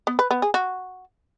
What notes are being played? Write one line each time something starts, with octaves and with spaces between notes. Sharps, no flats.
B3
B4
B3
G#4
F#4